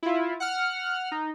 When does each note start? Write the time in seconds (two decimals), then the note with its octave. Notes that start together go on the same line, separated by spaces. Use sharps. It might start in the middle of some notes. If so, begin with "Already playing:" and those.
0.03 E4 F4
0.40 F#5 F6
1.12 D#4